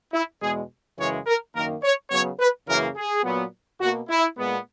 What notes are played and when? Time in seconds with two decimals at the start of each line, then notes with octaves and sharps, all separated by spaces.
0.13 E4
0.42 E2 B2 G#3 G#4
0.98 F#2 C#3 E3 G#3 C#5
1.26 A#4
1.55 F#2 D#3 A#3 A#4
1.83 C#5
2.11 C#3 F#3 B3 C#5
2.39 B4
2.68 F#2 C#3 E3 A#3 A#4
2.96 G#4
3.24 A#2 F#3 B3
3.80 B2 A#3 F#4
4.08 E4
4.37 A#2 G#3 B3